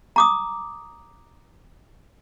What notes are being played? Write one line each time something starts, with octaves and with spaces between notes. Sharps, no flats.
A#5 D6 D#6